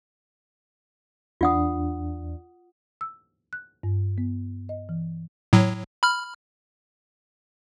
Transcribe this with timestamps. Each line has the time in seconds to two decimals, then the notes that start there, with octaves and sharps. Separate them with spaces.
1.41 E2 D4 F4 F#5 D#6
3.01 E6
3.53 F#6
3.83 G2
4.18 B3
4.69 D#5
4.89 E3
5.53 A2 F#3
6.03 B5 F6